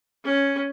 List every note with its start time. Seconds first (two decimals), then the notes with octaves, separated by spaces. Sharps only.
0.25 C#4